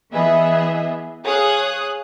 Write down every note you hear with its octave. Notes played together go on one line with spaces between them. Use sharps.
E3 B3 G#4 D#5 E5
G#4 C#5 F5 G#5 D#6 F#6